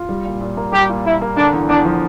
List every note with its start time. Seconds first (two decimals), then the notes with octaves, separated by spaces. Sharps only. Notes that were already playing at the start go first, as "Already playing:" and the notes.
Already playing: F4
0.09 G3
0.25 A#2
0.41 A#2
0.57 A#3
0.72 G3 G4
0.89 A#2
1.05 A#2 E4
1.22 A#3
1.37 D3 D4
1.53 E2
1.69 E2 D4
1.85 F3